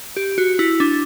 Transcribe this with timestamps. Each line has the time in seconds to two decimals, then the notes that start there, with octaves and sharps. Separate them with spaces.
0.17 G4
0.38 F#4
0.59 E4
0.80 D4